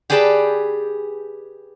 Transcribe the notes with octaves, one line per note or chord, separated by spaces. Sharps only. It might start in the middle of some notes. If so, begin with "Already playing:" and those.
G4 G#4 B4 D5 G5 A5